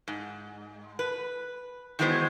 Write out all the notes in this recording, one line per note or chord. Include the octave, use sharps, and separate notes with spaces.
G#2
B4
D#3 E3 F#3 G#3 B3 C5